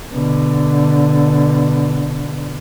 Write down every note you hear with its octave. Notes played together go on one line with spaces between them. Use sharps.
B2 D3